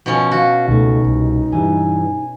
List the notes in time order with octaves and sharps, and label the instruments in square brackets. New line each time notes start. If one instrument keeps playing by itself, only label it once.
[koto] B2 F3 C#4
[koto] F#4 [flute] F5
[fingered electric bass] C#2 A3 [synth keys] B2 [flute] D#4
[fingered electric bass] C2
[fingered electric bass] G2 E3 G3 [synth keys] G#5